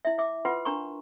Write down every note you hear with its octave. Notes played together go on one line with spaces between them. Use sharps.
E4 E5
E5 D6
F4 B4 F#5 C6
D4 A#4 A#5 C6 C#6